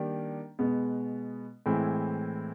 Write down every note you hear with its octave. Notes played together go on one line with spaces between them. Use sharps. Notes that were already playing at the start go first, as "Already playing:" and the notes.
Already playing: D#3 G3 A#3 D4 G4
B2 G#3 B3
A2 E3 G#3 C4 E4